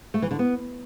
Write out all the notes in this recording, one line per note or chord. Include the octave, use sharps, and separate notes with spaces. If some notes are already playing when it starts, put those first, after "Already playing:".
A3
E3
D3
B3